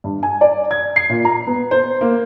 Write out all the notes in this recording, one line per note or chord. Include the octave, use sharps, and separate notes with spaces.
G2
G#5
D5
G#6
C7
A#2
A#5
B3
C5
A#3